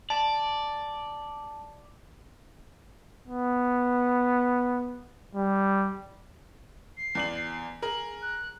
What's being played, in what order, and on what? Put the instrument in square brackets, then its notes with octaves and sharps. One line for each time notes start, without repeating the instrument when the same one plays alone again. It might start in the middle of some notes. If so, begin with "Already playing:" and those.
[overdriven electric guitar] D5 [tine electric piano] A5
[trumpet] B3
G3
[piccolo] C7
[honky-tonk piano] E2 D5 F#7
[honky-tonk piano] G#4 A#4 [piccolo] F#7
[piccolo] F#6